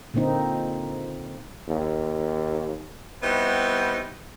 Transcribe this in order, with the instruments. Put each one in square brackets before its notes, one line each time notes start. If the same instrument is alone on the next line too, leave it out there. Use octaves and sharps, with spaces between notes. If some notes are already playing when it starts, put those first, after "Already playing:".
[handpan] A#2 D3 A#3 C4 D#4
[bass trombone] D#2
[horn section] G3 B3 C4 D#4 E4 F#4